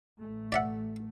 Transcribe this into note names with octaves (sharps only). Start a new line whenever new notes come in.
A1 A3
D5 E5 F#5